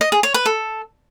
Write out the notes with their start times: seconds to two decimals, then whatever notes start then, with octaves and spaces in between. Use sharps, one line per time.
0.01 D#5
0.12 G#4
0.23 C#5
0.34 B4
0.46 A4